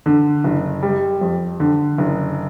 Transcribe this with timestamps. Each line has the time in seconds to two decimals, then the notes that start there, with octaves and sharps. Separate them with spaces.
0.06 D3
0.44 F#1
0.83 G3
1.21 F2
1.60 D3
1.98 F#1